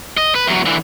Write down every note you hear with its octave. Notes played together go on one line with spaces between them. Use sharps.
D#5
B4
E2 F#3
D3 E3